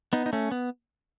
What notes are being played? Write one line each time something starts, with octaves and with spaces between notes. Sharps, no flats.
B3 D#4
D#4
A3 C#4
B3